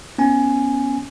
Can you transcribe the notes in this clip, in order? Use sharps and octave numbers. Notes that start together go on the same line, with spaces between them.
B3 C#4 G#5